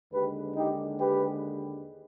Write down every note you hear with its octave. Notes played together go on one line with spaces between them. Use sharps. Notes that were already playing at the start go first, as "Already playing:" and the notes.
D#2 D3 G#3 G4 B4
D#4 G4
G4 B4